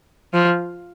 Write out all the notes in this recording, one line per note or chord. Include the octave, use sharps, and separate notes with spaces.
F3